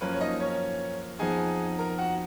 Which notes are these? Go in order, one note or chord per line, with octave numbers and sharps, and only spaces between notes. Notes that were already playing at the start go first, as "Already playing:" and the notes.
F#2 F3 A#3 C#4 B4
C#5
D#4 D#5
C#4 C#5
F2 F3 B3 D#4 G#4 G#5
A#4 A#5
F#4 F#5